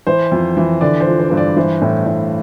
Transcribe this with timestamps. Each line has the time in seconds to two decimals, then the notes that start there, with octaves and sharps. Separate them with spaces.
0.07 E3 C5
0.32 F2
0.57 E3
0.81 D3 D5
1.00 C5
1.07 F3
1.19 C5
1.29 G2 C5
1.37 D5
1.56 E3 C5
1.82 A2
2.06 A2